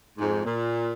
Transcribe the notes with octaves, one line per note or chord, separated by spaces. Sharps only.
F2 G#2
A#2